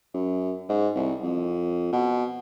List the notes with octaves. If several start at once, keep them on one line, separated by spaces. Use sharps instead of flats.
F#2
G#2
C2
F2
B2